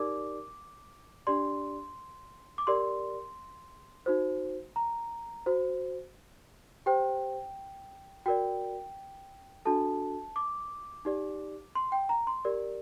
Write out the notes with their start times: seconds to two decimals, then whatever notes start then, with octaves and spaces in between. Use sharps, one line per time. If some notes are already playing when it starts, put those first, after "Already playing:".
Already playing: D#4 G4 A#4 D5 D6
1.27 D4 G4 D5 C6
2.58 D6
2.67 G4 A#4 D5 C6
4.06 D#4 F#4 C5
4.76 A#5
5.46 F#4 C5
6.86 G4 C5 G5
8.26 F#4 A#4 D5 G5
9.65 D4 F#4 A4 A5
10.36 D6
11.05 D#4 G4 D5
11.75 C6
11.92 G5
12.09 A#5
12.27 C6
12.45 G4 A#4 D5